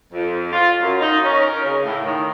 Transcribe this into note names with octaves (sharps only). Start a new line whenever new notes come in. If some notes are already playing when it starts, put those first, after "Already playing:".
F2
F4
F#2
D#4
C#4
A#4
C#3
A2
D#3